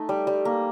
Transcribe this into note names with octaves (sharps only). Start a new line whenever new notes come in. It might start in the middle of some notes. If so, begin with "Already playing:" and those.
Already playing: A3 D#4
G3
G3
A#3